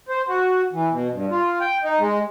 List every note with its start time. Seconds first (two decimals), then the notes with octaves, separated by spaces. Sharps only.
0.09 C5
0.28 F#4
0.73 E3
0.89 B2
1.12 G2
1.30 F4
1.61 G5
1.82 D#4
2.00 G#3